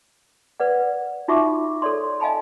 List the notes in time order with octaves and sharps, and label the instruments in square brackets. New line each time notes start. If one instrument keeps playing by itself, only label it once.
[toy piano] B4 D5 F#5
D#4 F4 F#4 E5 C#6 D6
A4 C#5 D5 C6
D#5 F5 G#5 A5 B5